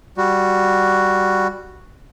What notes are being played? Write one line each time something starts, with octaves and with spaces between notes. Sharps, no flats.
G3 F#4